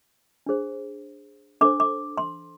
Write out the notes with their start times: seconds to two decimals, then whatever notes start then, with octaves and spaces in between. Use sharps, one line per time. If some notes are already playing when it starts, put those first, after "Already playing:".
0.46 D4 G#4 C5
1.61 D4 A4 C5 D6
1.80 D6
2.18 C6